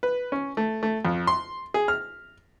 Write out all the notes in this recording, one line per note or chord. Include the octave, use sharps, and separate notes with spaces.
B4
C#4
A3
A3
F2
C6
G#4
F6